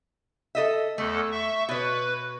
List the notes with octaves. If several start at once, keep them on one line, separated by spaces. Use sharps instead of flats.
A4 D#5 E5
E2 A3 A4
E5 C#6
B2 B4 C#5